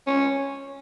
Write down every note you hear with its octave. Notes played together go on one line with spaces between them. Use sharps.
C#4